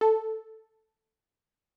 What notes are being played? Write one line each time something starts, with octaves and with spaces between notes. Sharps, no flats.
A4